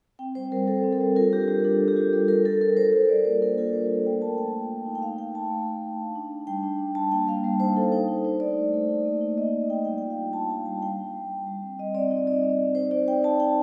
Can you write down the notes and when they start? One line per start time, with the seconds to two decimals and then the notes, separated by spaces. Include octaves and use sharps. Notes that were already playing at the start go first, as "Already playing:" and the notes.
0.19 C4 G5
0.35 G3 C5
0.52 G3 A#4
0.68 G3 A4
0.84 C4
0.93 A4
1.01 G3
1.16 F4 A#4
1.33 D4 G4
1.48 G3 G4
1.64 D4 A4
1.81 G3
1.88 G4
1.96 F4
2.13 G3 A4
2.28 G3 A#4
2.45 F4 A4
2.61 F4 A#4
2.77 G3 C5
2.93 G3 A#4
3.09 F4 D5
3.25 A#3 C5
3.42 D4 A#4
3.58 F4 A4
3.73 A#3 C5
3.90 A#3
4.06 A3 G5
4.22 A3 A5
4.38 A3 G5
4.54 A3
4.70 A3
4.86 D#4
4.95 G5
5.02 A3 F5
5.18 A3 G5
5.35 A3 A5
5.50 A3
5.67 D#4
5.82 D#4
5.99 D4
6.15 D4
6.31 D4
6.47 G3 G5
6.63 D4
6.79 D4
6.95 G3 A5
7.12 A#3 G5
7.27 G3 F5
7.44 G3
7.60 D#4 C5
7.76 D#4 A4
7.92 D#4 C5
8.08 D#4
8.25 D#4
8.40 A3 D5
8.57 A3
8.73 A3
8.89 D#4
9.05 A#3
9.21 D#4
9.37 A#3 D#5
9.53 A#3
9.70 D#4 G5
9.85 G3 G5
9.98 F4 G5
10.10 F5
10.18 D4
10.33 F4 A5
10.50 D4 A5
10.65 G3 A5
10.82 G3 G5
10.98 G3
11.15 G3
11.31 G3
11.47 G3
11.62 C4
11.79 G3 D#5
11.95 C4 D5
12.10 D#4 D#5
12.27 C4 D5
12.43 C4
12.60 C4
12.75 D#4 C5
12.91 D#4 D5
13.08 D#4 G5
13.23 D#4 A5
13.40 D#4 G5